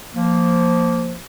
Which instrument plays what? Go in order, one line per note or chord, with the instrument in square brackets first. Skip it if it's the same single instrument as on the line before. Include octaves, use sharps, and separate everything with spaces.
[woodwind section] F3 A#3